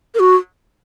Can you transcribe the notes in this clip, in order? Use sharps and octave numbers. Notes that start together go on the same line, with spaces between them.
A#4
F#4